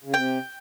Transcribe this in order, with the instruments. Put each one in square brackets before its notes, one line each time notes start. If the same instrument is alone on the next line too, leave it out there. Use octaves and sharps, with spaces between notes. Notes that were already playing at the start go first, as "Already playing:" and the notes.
[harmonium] C#3
[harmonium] C3 [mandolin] G5